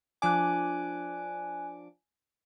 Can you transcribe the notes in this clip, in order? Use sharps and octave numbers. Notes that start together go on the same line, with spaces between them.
F3 D4 G#5 D6 F#6